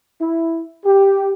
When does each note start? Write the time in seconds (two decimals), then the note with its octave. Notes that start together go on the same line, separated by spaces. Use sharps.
0.20 E4
0.85 G4